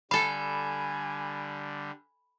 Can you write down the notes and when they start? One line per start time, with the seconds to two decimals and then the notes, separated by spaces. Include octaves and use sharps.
0.11 D3 G3 A4 F5 G#5 B5